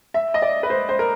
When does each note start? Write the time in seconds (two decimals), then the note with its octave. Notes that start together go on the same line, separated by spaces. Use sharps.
0.14 E5
0.34 D#5
0.42 D5
0.63 B4
0.70 C5
0.89 C5
0.99 A#4